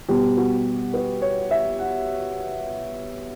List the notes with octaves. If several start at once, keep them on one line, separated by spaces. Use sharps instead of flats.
B2 G3 B3 G4
F#4
B4
C#5
E5
F#5